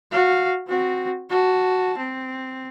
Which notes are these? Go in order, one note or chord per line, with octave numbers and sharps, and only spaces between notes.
F#4 F5
C4 F#4
F#4 A5
C4